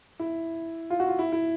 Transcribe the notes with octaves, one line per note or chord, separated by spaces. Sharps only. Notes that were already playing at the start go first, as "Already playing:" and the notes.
E4
F4
F#4
F4
E4
E4